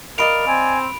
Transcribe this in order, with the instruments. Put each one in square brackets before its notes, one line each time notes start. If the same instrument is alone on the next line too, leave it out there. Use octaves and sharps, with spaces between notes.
[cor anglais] A#4 [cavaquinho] D5 D#5 F5 [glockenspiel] B5 D7 F7
[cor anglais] C4 [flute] G#5